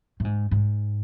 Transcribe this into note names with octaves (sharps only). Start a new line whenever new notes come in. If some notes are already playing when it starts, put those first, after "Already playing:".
A2
G#2
G#2